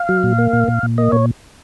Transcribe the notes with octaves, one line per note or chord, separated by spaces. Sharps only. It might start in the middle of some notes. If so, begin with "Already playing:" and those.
Already playing: F5
F#3
A#2
A#3
A#2
A#2
A#2
A#3 D#5
A#2 C#5